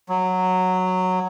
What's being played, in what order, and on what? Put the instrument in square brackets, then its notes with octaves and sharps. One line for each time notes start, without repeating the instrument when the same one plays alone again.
[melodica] F#3